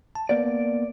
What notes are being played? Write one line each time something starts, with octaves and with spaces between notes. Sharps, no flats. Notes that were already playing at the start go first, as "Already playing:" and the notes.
A5
A#3 B3 D5